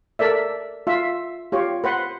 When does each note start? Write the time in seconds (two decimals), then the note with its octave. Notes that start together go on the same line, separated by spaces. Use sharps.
0.19 A4 A#4 D5 E5
0.87 F4 E5
1.52 F4 G4 C#5
1.84 B4 C5 F#5